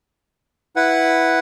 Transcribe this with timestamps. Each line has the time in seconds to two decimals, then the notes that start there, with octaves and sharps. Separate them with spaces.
0.76 E4 B4 F#5